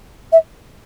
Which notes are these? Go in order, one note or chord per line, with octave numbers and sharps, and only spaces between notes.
E5